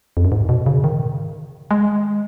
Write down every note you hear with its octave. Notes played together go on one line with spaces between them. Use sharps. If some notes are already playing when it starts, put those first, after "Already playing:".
F2
F#2
G#2
B2
C#3
D#3
G#3